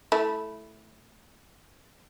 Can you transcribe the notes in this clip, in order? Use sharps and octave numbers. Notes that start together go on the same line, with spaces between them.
A3 E4